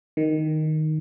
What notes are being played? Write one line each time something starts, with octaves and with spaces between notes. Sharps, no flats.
D#3